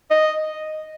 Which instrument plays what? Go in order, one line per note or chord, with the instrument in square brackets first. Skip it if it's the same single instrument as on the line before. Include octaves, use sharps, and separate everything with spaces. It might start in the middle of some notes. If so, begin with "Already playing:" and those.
[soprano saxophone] D#5